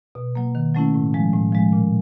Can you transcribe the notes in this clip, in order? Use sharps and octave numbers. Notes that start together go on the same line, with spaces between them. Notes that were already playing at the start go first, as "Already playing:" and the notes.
B2
F#3 A#3
D#3
F#3 A3 C#4 E4
A2
F3 G#3
A2
F3 G#3
A#2